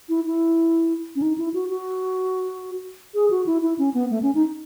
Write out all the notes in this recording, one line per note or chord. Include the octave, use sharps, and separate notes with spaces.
E4
E4
C#4
D#4
E4
F#4
F#4
G#4
F#4
E4
E4
C#4
B3
A3
C#4
D#4